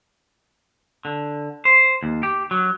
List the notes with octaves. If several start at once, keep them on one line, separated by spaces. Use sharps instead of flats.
D3
C5
D#2
G4
F#3